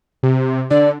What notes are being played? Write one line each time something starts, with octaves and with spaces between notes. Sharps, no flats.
C3
D3 D5